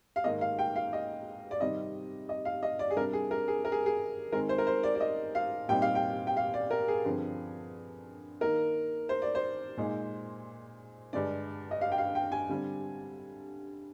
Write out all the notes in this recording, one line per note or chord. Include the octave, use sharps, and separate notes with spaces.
F5
G#2 D#3 A#3 D#4 D#5
F5
G5
F5
D#5
D5
C3 D#3 G3 C4 D#4 D#5
D#5
F5
D#5
D5
G#4
C3 G3 D4 A#4
G#4
A#4
G#4
A#4
G#4
G#4
D#3 G#3 C4 A#4
C5
A#4
C5
D5
D5
D#5
F5
A#2 G3 C4 D#4 G5
F5
G5
G5
F5
D5
A#4
G#4
G2 D3 F3 C4
D#3 A#3 D#4 A#4
C5
D5
C5
A#2 G#3 D#4
G2 D3 G#3 D4 D5
D#5
F5
G5
F5
G5
G#5
D3 G3 C4